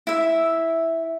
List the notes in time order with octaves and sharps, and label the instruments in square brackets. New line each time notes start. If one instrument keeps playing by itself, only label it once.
[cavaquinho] E4 E5